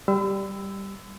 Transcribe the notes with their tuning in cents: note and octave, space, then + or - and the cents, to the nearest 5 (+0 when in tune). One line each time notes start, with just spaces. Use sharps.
G3 +0 B5 +45 E6 +0